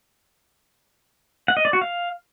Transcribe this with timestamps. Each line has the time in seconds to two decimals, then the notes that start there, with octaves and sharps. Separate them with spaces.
1.48 F#5
1.57 D#5
1.65 D5
1.73 F#4
1.81 F5